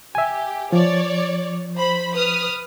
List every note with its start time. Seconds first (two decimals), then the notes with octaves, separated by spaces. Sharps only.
0.15 G4 E5 G#5
0.73 F3 C#5 D5
1.76 C5 B5
2.15 B4 D#6 F6